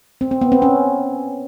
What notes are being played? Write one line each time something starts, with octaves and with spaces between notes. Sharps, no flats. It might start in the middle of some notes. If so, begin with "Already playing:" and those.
C4
C4
B3
C4
C#4